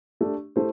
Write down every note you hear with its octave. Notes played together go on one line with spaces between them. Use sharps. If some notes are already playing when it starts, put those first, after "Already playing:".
A3 D4 G4
A3 E4 G4 C5